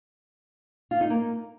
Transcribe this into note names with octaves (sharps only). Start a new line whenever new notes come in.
F4
D#4
A#3